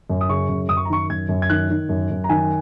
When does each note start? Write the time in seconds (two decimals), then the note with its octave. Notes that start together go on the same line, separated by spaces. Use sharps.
0.10 F#2
0.21 D#6
0.29 C#3 C#6
0.49 F#2
0.69 F#2 D#6
0.77 C#6
0.85 A#5
0.90 D#3 C#6
1.09 F#2 G#6
1.29 F#2
1.42 G#6
1.50 D#3 F#6
1.70 D#3
1.89 F#2
2.10 F#2
2.24 A#5
2.29 D#3 G#5